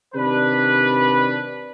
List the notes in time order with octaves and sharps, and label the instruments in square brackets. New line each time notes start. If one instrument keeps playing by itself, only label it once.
[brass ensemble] C3 D#3 D4 B4